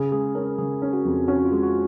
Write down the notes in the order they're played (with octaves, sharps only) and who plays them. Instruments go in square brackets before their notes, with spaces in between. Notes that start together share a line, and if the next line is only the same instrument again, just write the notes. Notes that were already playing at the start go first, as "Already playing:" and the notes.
Already playing: [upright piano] C#3 [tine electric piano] G#4
[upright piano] G#3 [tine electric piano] G#4
[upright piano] C#4 [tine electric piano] A#4
[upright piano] C#3 [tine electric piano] G#4
[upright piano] C#4
[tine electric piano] F#4
[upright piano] F2
[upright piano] C#4 [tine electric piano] F#4
[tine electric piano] F4
[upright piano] G#3
[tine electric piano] F#4